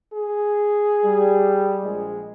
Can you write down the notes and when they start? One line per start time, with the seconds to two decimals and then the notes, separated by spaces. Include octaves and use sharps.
0.14 G#4
1.04 G3
1.84 A#1 G#3